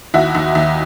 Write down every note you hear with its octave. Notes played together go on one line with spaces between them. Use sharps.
D#2 E4 F#4
D#2
D#2